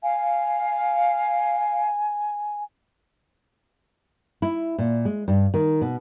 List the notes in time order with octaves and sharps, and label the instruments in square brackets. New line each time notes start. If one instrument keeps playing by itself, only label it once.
[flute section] F5 [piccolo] G#5
[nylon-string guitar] E4
A#2
G#3
G2
D#3
B2